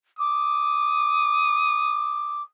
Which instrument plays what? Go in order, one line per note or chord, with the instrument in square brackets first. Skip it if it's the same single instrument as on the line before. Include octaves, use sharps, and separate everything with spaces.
[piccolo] D6 [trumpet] D#6